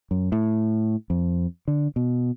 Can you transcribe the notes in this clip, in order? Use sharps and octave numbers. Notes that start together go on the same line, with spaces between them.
F#2
A2
F2
D3
B2